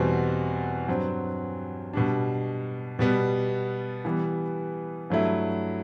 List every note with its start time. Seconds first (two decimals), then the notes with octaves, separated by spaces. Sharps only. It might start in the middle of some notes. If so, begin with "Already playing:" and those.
Already playing: E2 B2 G3 C4 F#4
0.88 G2 F#3 C4
1.93 B2 G3 D4
2.99 B2 G3 B3
4.05 E3 G3 B3
5.10 G2 F#3 A3 E4